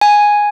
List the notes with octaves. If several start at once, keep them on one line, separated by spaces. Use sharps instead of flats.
G#5